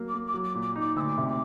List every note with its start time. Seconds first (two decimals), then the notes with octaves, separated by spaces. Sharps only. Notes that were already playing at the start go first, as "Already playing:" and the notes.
Already playing: F#3 A#3
0.08 D6
0.14 A#3
0.27 D6
0.34 F#3
0.44 D6
0.55 A#2
0.62 D6
0.76 D#4 D6
0.96 D2 D6 E6
1.18 C3
1.28 D6